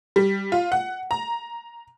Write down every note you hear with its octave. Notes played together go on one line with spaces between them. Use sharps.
G3
F4
F#5
A#5